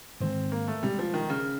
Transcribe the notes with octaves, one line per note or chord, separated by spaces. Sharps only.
G#2 D#3 G#3 C4
A#3
A3
B2 G3 G#3 C#4
F3
D#3
C#3